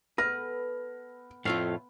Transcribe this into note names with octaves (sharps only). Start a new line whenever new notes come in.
B3 A4 B4 F6 A#6
F2 A2 A3 F4 F5